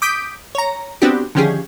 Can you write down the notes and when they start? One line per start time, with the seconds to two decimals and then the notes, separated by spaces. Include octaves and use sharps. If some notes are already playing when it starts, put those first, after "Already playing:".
0.02 D6 D#6 G6 B6 D7
0.55 C#5 A#5
1.02 B3 C4 D4 F#4 G4
1.35 D3 D#3 F3 C#4 G4 G#4